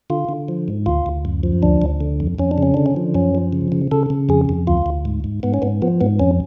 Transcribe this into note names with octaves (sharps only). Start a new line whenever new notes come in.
D3 F4
D3
F3
G#2
D2 F4
D2
F#2
F3
D2 D4
D2
D3
F2
F2 C#4
D4
C#3 C#4
D3 D4
C#4
F3
F#2 C#4
F3
C#3
C#3
C#3 A4
C#3
F2 G#4
F2
D2 F4
D2
G#2
G#2
G#2 B3
C#4
G#2 B3
F3 B3
G#2 B3
F2 C#4